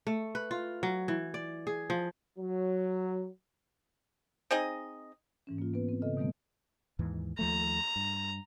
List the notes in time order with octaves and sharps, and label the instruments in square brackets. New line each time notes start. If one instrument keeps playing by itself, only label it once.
[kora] A3
B4
F4
F#3
E3
D5
G#4
F3
[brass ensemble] F#3
[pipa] C4 D#4 G#4 D#5
[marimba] G#2 E3 C#4
A#3 F4
B3 B4
C4
C#3 A4 D#5
B2 D#3 G3 A3 B3
[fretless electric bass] D#2 G#2 E3
[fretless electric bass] D#2 F3 A3 [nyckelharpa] A#5
[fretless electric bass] G2